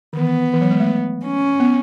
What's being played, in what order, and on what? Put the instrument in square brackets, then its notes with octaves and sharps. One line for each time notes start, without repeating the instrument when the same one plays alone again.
[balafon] D#3
[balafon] E3 [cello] B3
[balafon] E3
F#3
G#3
A3
[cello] C#4
[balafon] B3